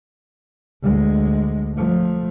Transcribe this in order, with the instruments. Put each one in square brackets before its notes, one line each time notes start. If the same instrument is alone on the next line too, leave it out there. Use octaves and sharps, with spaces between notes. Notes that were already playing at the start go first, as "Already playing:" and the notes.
[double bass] D2 G#3
F3 A3